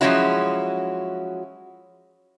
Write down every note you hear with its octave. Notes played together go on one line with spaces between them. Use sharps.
F3 F#3 G#3 C#4 E4 F#4